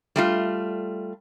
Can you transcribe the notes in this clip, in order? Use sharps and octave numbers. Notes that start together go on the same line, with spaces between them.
G3 A3 F4